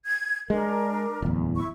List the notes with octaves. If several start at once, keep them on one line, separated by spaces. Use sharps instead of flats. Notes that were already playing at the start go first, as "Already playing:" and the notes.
G#6
G#3 D4 A#4
D1 E2
E4 C#6